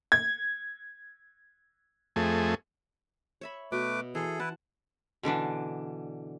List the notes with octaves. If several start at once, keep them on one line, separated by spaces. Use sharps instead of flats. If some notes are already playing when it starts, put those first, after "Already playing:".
G#6
F2 A3 G#4
C#5 E5 B5
B2 A3 B4 D6
E3 G#4 A4 C6
E4 B4 F#5 A5
B2 D3 E3 D4